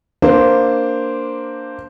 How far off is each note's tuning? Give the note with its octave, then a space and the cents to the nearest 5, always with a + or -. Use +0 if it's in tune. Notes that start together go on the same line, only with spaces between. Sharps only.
A#3 +0 D4 +0 C5 +0